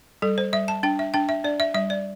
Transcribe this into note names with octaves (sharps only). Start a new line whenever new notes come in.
G3 A4
C5
G3 E5
A5
D4 G5
E5
D4 G5
E5
D4 D5
E5
G3 E5
D5